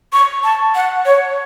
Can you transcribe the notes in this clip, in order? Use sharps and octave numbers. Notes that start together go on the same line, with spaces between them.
C#6
A5
F#5
C#5